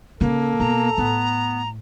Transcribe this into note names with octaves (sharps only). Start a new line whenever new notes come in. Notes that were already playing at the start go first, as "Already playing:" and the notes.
C#3 A#3 A4
B2 A#5
A2 B3